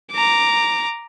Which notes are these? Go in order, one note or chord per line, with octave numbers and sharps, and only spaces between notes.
A#5 D6